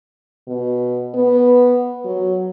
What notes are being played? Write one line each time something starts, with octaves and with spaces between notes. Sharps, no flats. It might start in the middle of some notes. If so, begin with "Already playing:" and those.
B2
B3
F#3